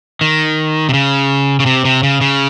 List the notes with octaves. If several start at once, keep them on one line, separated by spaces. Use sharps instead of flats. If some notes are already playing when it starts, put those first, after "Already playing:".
D#3
C3
C#3
C#3
C3
C3
C#3
C#3